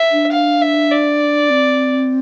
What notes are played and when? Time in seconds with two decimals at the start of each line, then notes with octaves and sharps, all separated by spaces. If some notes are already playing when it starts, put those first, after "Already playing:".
Already playing: E5
0.12 D4
0.32 F5
0.61 E5
0.91 D5
1.50 C4